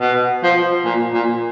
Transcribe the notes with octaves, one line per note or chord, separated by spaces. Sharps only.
B2
F3
A#2
A#2